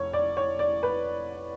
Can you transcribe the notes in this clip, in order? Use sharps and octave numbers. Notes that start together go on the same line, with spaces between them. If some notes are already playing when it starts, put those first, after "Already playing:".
Already playing: F1 C#5
D5
C#5
D5
B4